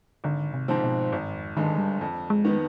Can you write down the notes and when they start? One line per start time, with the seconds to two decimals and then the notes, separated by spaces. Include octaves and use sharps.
0.24 G#1 D3
0.54 C3
0.68 G#2 F3 C4
0.83 B2
1.12 G#1 G2
1.35 F2
1.57 G2 D3 D#3 G#3
1.78 G3
2.01 F2
2.30 G#3
2.45 D#3 B3